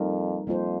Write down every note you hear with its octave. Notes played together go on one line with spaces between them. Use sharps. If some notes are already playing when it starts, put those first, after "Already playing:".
Already playing: F2 G3 A#3 D#4 A#4
F2 G3 A#3 F4 C5